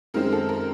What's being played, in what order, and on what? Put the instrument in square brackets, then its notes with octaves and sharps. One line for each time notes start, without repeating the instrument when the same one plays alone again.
[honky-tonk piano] F#2 D#3 G#3 C4 A#4
A4
A#4